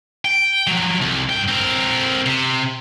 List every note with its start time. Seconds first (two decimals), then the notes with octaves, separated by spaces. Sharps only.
0.25 G5
0.67 F3 F#3
1.01 C2
1.29 G2 G5
1.48 C4 A#4
2.26 C3